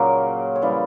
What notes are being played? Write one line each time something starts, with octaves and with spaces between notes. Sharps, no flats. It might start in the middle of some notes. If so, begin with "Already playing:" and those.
Already playing: A#2 C#3 F#3 A#3 A#4 C#5
C#5
C#3 E3 G3 D5